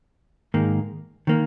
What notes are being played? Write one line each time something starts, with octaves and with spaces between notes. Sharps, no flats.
G#2 D#3 A#3
D#3 A#3